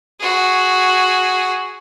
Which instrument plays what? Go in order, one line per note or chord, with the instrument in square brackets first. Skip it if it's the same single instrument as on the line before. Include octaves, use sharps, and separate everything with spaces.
[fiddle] F#4 G#4